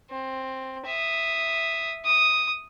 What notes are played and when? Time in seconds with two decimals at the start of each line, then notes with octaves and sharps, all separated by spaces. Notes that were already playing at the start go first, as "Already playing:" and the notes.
0.10 C4
0.86 E5 D#6
2.05 D#6